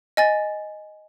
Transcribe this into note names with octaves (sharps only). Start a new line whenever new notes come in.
D#5 G#5 A6